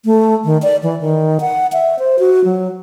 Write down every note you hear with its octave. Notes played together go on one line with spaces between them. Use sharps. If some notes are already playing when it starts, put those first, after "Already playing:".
A3
D#3
D5
E3
D#3
F#5
E5
C5
F#4
F#3